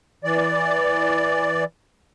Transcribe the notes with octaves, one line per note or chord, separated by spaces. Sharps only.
E3 D5